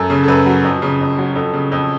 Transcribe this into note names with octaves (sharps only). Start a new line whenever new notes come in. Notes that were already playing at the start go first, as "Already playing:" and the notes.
Already playing: F#2 A4
C#3
A4
F#2 B4
F#3
F2
C#3
F2
F#3
F2 A4
C#3
F2